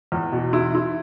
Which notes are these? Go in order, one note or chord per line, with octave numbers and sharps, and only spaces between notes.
E2
B2
E4
E4